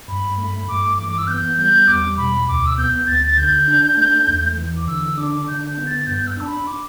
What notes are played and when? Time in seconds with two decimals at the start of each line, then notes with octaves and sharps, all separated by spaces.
0.08 G2 B5
0.38 A3 B5
0.68 G2 D6
0.98 E3 D6
1.08 D6
1.18 E6
1.27 B3 G6
1.58 G3 G6
1.87 E2 D6
2.18 B2 B5
2.47 D2 D6
2.66 E6
2.78 B3 G6
3.07 D2 A6
3.27 A6
3.38 D3 G6
3.68 D4
3.97 A3
4.28 E2
4.57 E3
4.77 D6
4.87 D3 E6
5.18 D4 D6
5.47 D3 G6
5.67 G6
5.77 B3
5.87 A6
6.07 G2 G6
6.27 E6
6.37 D4 A5
6.47 B5
6.67 D6